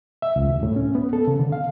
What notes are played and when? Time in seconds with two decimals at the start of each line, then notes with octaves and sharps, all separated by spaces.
0.22 E5
0.36 C#2
0.49 D2
0.63 A2
0.76 C#4
0.95 B3
1.13 A4
1.27 C#3
1.39 D3
1.52 F5